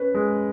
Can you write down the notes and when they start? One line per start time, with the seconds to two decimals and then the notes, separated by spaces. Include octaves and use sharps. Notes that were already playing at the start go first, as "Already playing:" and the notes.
Already playing: C#4 B4
0.15 G#3